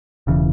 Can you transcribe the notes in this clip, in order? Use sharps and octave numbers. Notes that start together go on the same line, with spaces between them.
E1 C#3 E3